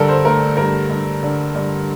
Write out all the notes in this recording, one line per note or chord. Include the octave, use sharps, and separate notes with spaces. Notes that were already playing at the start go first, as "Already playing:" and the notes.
Already playing: G2 D3 A4 A#4
C5
A3 A#4
G2 A#4
G2
D3
G2